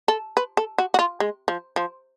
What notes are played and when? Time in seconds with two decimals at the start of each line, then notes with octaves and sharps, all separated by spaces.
0.08 A4
0.37 B4
0.57 A4
0.78 F#4
0.94 F#4
0.99 F4
1.20 G#3
1.48 F3
1.76 F3